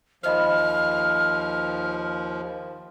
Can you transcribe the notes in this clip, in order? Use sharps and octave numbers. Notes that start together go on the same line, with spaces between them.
D#2 F3 C5 D#5 B5 F6